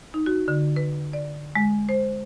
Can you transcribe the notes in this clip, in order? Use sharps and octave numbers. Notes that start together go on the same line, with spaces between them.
D#4
F#4
D3
B4
D5
G#3
C5